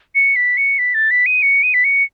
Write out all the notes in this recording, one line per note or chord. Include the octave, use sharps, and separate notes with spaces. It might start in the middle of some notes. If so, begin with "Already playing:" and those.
C#7
B6
C#7
B6
A6
B6
D#7
C#7
D#7
B6
C#7